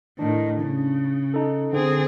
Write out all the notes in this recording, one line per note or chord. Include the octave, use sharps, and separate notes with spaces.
A2 D#3 D4
C#3
D#4 A4
D3 C4 G#4